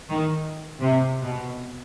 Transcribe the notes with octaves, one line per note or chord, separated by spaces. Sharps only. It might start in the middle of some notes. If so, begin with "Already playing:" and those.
D#3
C3
B2